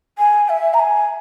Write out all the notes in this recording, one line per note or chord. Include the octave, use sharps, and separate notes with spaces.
G#5
E5
A#5
G#5